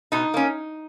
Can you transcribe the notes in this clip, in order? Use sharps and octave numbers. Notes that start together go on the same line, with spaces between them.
B2 D#4
A#3 C#4